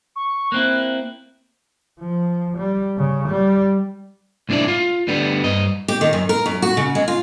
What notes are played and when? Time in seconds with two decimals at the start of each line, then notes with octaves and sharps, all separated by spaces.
0.16 C#6
0.52 A#3 C4 E4 F#6
2.00 F3
2.57 G3
2.98 C#3
3.29 G3
4.49 C2 A2 D4 E4 D5
4.68 F4
5.08 D2 D3 G3 B3
5.44 G2 D#5
5.88 G4
6.01 D#3
6.13 F#2
6.29 A#4
6.46 F#2
6.62 F#4
6.77 C#3
6.95 G#3
7.08 F4